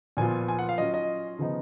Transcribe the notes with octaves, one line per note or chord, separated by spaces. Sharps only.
A#2 F3 B3 F4 G#5
G#5
F#5
F5
F#3 C#4 F4 D#5
D#5
C#3 F3 B3 D#4